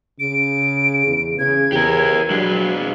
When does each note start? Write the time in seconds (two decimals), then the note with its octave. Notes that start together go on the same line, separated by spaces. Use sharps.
0.20 C#3 D7
1.07 E2
1.39 C#3 G#6
1.72 E2 G4 A#4
2.31 F#3 G#3 D4